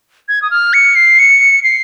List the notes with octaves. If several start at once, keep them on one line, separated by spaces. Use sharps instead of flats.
G#6
D#6
F6
C#7
C7
C#7
C7